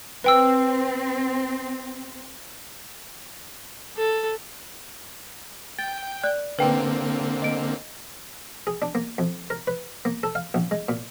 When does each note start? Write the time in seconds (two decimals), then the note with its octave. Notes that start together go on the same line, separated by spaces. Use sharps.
0.24 C4 B4 G5 E6
3.97 A4
5.79 G5 A6
6.24 D5 F#6
6.59 D3 A#3 C4 B4 G5
7.42 D#5 D7
8.67 G#4
8.82 D4
8.95 A#3
9.18 F2
9.50 A#4
9.67 B4
10.05 A#3
10.23 A4
10.35 F5
10.54 A#1
10.71 G#3
10.89 A#2